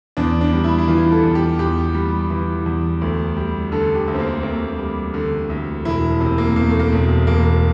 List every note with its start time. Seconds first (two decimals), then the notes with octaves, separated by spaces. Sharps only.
0.17 E2 D4
0.41 D4
0.53 G3
0.64 E4
0.78 E4
0.88 E3 F4
1.12 A4
1.24 E2
1.35 G4
1.59 E2 G4
1.95 G3
2.30 E3
2.66 E2
3.01 D2
3.37 G3
3.72 D3 A4
3.95 G4
4.07 D2
4.14 C4
4.20 A#3
4.43 D2 A#3
4.78 G3
5.14 D3
5.49 D2
5.85 E1 E4
6.20 C3
6.38 A#3
6.56 E2 A#3
6.70 A3
6.79 A#3
6.92 E1
7.27 E1 A#3